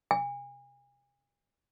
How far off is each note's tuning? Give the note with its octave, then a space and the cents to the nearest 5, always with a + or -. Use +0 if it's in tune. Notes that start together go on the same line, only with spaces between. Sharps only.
G#5 -35